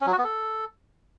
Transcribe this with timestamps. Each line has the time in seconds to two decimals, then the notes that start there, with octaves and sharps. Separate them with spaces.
0.01 C#4
0.07 F#3
0.12 F#4
0.18 B3
0.24 A4